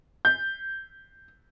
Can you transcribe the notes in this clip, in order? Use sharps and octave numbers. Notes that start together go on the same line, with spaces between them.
G6